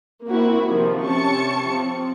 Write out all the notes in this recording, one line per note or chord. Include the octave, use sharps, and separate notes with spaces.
A#3 C4 E4 F#4
C3 D#3 F3
C3 C#4 A5 C#6 C#7
F3 C4